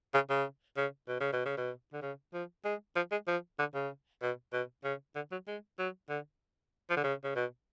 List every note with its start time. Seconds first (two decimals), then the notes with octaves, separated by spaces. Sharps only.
0.14 C#3
0.30 C#3
0.77 C#3
1.08 B2
1.20 C#3
1.33 B2
1.45 C#3
1.57 B2
1.93 D3
2.02 C#3
2.34 F3
2.65 G#3
2.96 F3
3.11 G#3
3.27 F3
3.59 D3
3.74 C#3
4.22 B2
4.53 B2
4.84 C#3
5.15 D3
5.32 F#3
5.47 G#3
5.78 F#3
6.09 D3
6.90 F3
6.97 D3
7.04 C#3
7.24 C#3
7.35 B2